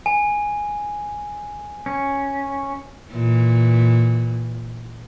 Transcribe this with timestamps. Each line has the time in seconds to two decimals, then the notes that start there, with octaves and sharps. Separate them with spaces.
0.06 G#5
1.86 C#4
3.11 A#2 E3